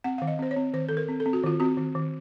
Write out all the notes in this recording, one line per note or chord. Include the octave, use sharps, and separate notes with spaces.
C4 F#5
D#3 F5
D#5
C4 C5
C#5
C4
D#3 C5
D#3 A4
A#4
C4
A4
C4
F#4
D#3 F4
C4 F#4
D#3
D#3